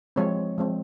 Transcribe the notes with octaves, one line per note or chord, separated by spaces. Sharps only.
F3 G#3 C4 C#5
F3 G#3 C4